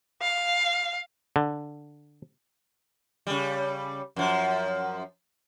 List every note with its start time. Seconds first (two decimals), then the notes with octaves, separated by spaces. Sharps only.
0.22 F5
1.36 D3
3.27 C#3 G3
4.16 F#2 F3